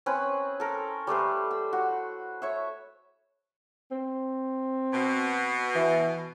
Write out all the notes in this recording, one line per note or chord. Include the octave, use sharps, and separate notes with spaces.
C4 C#4 B4
A4 A#4
G3 A3 B4 C5
E6
F#4
C#5 E5
C4
B2
E3